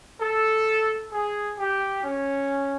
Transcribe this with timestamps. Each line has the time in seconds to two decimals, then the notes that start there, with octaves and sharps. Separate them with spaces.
0.20 A4
1.12 G#4
1.58 G4
2.04 C#4